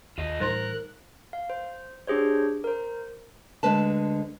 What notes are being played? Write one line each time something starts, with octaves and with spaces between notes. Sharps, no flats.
D#2 F4 D#5
A2 E3 G3 D#4 A#4 C5 C6 F#6
F5
C5
D4 G4 G#4 C5 C#5
A#4 C5
D2 D3 G#3 B4 A5